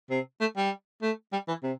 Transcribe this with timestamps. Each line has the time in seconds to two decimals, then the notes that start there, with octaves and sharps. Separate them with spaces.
0.10 C3
0.40 A3
0.56 G3
1.02 A3
1.32 G3
1.48 E3
1.63 C3